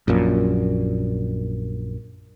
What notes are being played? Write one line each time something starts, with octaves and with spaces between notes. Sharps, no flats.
A#1 F#2 A#2